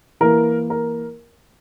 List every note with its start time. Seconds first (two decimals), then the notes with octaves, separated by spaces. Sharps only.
0.21 E3 A#3 E4 A#4
0.70 A#4